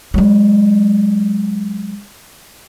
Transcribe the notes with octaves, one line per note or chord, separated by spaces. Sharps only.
F#3 G#3